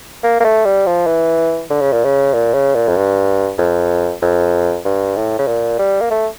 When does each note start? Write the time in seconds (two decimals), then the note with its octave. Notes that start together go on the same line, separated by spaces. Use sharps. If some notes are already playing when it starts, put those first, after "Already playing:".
0.24 A#3
0.40 A#3
0.45 A3
0.65 G3
0.86 F3
1.07 E3
1.70 D3
1.81 C#3
1.92 A#2
2.04 C#3
2.34 A#2
2.54 C#3
2.75 A#2
2.88 F2
2.97 G2
3.58 F2
4.22 F2
4.85 G2
5.16 A2
5.39 C#3
5.47 A#2
5.79 G3
6.01 A#3
6.10 A3